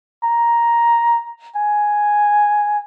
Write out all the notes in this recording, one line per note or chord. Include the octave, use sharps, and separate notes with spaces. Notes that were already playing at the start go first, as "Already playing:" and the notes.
A#5
G#5